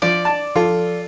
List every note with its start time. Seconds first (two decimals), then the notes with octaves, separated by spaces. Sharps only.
0.02 F3 D5
0.25 A5
0.56 F3 F4 A4